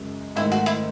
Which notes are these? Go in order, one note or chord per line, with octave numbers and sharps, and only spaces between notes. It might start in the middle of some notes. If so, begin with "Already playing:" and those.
Already playing: F#2 C#3 G#3
G#2 D#3 A3 E4
F#4
E4